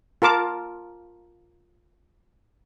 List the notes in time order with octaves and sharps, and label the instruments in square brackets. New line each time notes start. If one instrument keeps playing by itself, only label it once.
[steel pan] F4 A#4 A5 D6